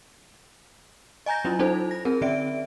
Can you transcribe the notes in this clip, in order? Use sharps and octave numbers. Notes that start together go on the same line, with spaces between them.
D#5 G#5 A#5 G6 A#6
F#3 C#4 E4 F4
C#4 D#4 F4 A4 C5
A#6
C4 G#4 A#4
D3 C4 C#4 D5 E5 D7